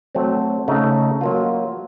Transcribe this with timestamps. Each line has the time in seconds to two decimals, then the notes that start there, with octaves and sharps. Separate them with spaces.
0.15 F#3 A3 C4
0.68 C#3 A3 D#4
1.21 F#3 A#3 F4